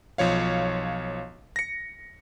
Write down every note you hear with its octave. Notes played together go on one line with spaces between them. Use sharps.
B1 F3 C#5 F5
A#6 C#7